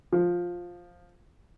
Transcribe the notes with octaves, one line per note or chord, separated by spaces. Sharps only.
F3